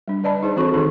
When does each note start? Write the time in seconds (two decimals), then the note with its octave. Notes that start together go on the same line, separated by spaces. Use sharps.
0.08 G3 D4
0.24 B4 D5 D#5 A5 B5
0.43 D#4 G#4 C5
0.56 E3 C4 D4 F#4 A4 C#6
0.74 D#3 D#4 G#4 A4 C6